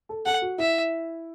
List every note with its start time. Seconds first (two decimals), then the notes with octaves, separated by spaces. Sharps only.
0.09 A4
0.26 A4 F#5
0.42 F#4
0.58 E4 E5